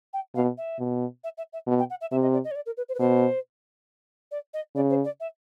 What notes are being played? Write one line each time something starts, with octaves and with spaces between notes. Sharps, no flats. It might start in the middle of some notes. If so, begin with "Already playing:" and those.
G5
B2 F5
E5
B2
E5
E5
E5
B2
G5
F#5
E5
C3 E5
D#5
D5
D#5
C#5
D5
A#4
B4
C5
B4
B2 C5
D5
D#5
C#3 D5
C5
D5
E5